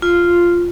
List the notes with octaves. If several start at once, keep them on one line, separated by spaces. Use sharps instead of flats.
F4